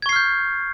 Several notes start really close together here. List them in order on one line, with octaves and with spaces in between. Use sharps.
G#6 C#6 C7 F6 G6